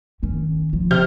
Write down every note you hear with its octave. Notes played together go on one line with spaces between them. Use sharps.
D#3 C#4
F3
C3 F6 G6